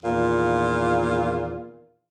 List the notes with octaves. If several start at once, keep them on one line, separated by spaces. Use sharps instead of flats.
E2 A#2 D#3 F4